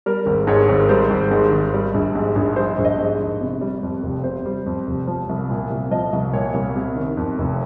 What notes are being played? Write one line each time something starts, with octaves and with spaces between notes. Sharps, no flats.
G3 A#4
G#1
G#2 C#5
G#1
G3 C5
G#1
G#2
G#1
G3
A#1
G#2
A#1
G3 C5
A#1
D#5
G#2
A#1
C3
G3
F2
F1
C3 C5
G3
F2
F1
F3
C2
A#2
C2
F3 D#5
C2
A#2 C#5
C2
C3
D#3
F2
F1